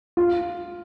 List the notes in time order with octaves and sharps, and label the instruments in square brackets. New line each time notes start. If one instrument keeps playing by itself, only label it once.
[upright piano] F4